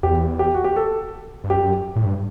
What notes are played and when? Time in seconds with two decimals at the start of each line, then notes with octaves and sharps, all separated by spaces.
0.03 E2 G4
0.39 G4
0.54 F#4
0.64 G4
0.76 A4
1.44 G2
1.50 F#2 G4
1.96 A2
2.05 G2